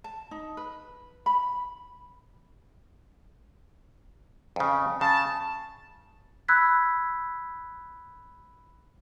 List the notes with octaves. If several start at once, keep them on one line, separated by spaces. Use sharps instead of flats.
A5
D#4
B4
B5
F2 C#3
C#3 A5
B5 E6 F#6 G#6 B6